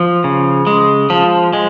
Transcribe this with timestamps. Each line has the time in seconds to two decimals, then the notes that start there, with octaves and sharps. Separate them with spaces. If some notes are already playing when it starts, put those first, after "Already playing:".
Already playing: F3
0.24 C#3
0.67 G#3
1.10 F3
1.53 G#3